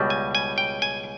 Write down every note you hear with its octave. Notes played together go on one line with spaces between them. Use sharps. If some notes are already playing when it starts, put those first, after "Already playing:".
Already playing: C#2 B2 G3
G#5
G#5
G5
G#5